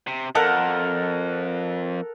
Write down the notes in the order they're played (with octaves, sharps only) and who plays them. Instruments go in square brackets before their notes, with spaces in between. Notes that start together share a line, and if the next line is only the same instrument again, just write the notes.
[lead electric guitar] C3
[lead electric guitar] F2 [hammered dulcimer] A4 A#4 F#5